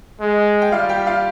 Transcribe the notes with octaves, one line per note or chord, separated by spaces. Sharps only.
G#3
G5
G3 F4 F5
G4 G5
F4 F5